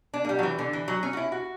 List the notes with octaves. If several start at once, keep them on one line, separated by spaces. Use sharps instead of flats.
D4
A#3
G3
F#3
E3
D3
E3
F#3
C#4
F#4
E4
F#4